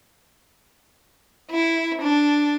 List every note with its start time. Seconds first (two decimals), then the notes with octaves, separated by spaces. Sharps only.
1.51 E4
2.02 D4